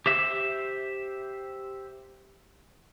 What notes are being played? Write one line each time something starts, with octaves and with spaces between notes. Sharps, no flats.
G4 C5 E5